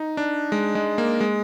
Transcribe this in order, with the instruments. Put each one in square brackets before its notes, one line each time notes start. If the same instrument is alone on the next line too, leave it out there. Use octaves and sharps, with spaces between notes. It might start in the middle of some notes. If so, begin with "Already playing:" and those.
Already playing: [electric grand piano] D#4
D4
G#3
G#3
A#3
G#3